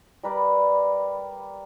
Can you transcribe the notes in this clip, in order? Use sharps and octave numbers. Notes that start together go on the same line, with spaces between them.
G3 A#4 B4 D5